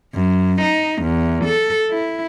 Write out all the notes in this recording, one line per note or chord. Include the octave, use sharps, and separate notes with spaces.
F#2
D#4
E2
A4
E4